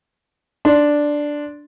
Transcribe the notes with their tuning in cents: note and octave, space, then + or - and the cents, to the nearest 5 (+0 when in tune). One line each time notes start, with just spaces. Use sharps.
D4 +0 C6 +0